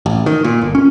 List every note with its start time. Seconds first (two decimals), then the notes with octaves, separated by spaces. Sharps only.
0.06 A1
0.26 D#3
0.44 A#2
0.62 G1
0.75 C#4